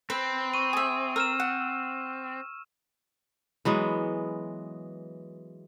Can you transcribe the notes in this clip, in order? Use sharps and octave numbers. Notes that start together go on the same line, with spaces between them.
C4 B4
C#6 D#7
G#4 E5
A#4 E6 F6 E7
F#5
E3 F#3 G#3 B3